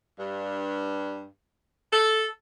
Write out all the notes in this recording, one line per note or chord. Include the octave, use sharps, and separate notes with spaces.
G2
A4